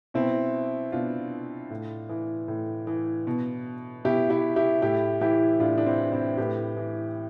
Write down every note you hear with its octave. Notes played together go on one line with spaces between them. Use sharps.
B2 C4 E4
B2 D4 F4
A2
E3
A2
E3
B2
B2 E4 G4
E4 G4
E4 G4
A2 E4 G4
E3 E4 G4
A2 D4 F4
D4
C4 E4
E3
C4 E4
A2 G4 B4
E3